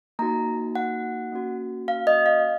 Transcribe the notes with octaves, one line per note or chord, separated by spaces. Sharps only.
A#3 D#4 F#4 A#5
F#5
A#3 C#4 F#4
F5
D#5
F5